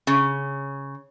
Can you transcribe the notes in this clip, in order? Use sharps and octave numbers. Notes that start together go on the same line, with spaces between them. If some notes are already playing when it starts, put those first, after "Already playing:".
C#3